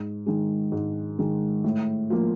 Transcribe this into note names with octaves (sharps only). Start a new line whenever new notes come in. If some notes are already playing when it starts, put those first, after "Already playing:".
Already playing: G#2
D#3 G#3
G#2
D#3 G#3
A2
F3 A#3